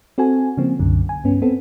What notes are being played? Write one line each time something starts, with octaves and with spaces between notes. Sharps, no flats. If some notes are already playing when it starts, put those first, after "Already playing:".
C4 F#4 A4 G#5
C#3 F3 A#3 C4
C2 F#2 D3
G#5
G2 B3 C#4
B3 C4 A4